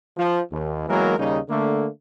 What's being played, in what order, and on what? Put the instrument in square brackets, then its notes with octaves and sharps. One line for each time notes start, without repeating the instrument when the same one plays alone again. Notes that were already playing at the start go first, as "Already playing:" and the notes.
[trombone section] F3
D#2
E3 F#3 G#3 A#3 B3 A#4
D#2 C#3 G3 A#3 D#4
D3 A3 A#3